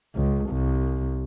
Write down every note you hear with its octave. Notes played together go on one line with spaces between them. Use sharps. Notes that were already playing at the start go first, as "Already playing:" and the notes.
C#2
C2